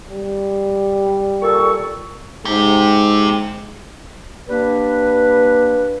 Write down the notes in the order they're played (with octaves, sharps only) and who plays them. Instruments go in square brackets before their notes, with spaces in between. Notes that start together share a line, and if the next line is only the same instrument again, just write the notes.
[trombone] G3
[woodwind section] A#2 A4 C#6
[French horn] G#2 [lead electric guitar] C4 G4
[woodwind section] G3 A#3 D4 B4